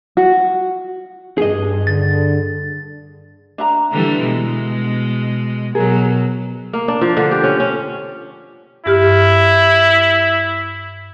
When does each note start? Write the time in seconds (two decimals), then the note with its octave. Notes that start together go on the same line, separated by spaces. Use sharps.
0.17 F#4
1.38 G2 G#4 D#5
1.87 D3 A6
3.58 D4 E5 A#5
3.91 D3 E3 G3
4.22 B2 G#3
5.75 B2 F#3 G#4 A#4
6.73 A#3
6.88 D4
7.01 F3
7.17 D3
7.31 G4
7.43 C#4
7.60 C#4
8.86 G2 E4 G4 F6